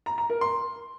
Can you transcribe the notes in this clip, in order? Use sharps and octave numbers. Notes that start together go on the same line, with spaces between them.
A#5
A#5
A#4
C6